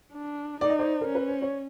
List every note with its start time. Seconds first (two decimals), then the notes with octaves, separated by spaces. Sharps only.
0.13 D4
0.61 D#4 D5
0.70 D#5
0.79 C5 D5
1.01 A#4
1.08 C#4
1.15 B4
1.28 C5
1.42 C#5